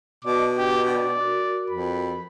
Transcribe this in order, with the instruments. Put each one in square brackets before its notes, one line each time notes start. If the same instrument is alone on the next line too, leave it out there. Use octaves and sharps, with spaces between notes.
[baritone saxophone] B2 [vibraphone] D5 D#5 A5 [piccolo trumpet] D6
[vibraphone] D4 [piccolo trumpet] G4
[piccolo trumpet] D5
[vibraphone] F#4 A#4
[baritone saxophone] F2 [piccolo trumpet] B5